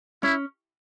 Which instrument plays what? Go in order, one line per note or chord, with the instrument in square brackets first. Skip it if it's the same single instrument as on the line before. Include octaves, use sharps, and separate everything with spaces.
[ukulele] C#4 [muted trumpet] E4